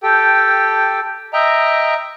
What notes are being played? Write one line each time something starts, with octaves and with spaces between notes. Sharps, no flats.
G4 A4 G5
D#5 E5 G5 A#5